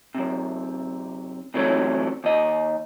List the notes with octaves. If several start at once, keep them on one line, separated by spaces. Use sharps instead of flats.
F#2 C3
C3 E3 F#3 A3 C#4
D#2 D#5